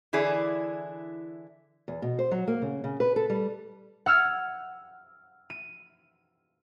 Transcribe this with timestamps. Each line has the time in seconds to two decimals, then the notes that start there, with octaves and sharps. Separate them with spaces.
0.13 D3 E3 E4 G#4 D5
1.88 E2
2.02 B2
2.19 C5
2.31 F#3
2.48 A#3
2.62 C#3
2.84 C#3
3.00 B4
3.16 A4
3.30 G3
4.06 F#5 E6 F6 G#6
5.50 D#7